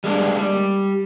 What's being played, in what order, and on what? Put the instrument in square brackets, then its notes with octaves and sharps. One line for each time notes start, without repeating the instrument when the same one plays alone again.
[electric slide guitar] G3 G#3 A#3 D4
G3